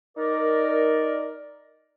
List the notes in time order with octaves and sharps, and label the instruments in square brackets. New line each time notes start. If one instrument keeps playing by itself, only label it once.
[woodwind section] D#4 A#4 D5